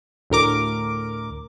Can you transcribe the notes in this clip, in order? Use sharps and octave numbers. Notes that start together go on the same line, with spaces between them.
D2 A2 A#4 D6